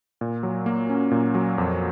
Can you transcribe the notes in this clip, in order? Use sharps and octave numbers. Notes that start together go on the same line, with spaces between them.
A#2
F#3
A#3
C#4
A#2
F#3
F2